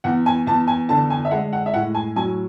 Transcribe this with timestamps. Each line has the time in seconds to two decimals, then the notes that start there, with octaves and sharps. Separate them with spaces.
0.04 E2 F#5
0.26 G#5
0.47 E2 A5
0.68 G#5
0.89 D3 A5
1.10 G#5
1.25 E5
1.31 G#3 F#5
1.53 F#5
1.66 E5
1.74 A2 F#5
1.95 G#5
2.16 F#3 G#5